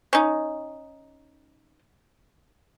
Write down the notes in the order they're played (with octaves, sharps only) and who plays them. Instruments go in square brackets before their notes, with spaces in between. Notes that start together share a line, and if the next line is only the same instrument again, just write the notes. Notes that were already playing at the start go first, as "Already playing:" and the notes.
[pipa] C#4 D#4